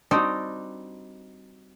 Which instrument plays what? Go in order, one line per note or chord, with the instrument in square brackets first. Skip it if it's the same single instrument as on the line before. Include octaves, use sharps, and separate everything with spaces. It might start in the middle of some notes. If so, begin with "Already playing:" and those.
[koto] G3 C4 D4 D#4 F#4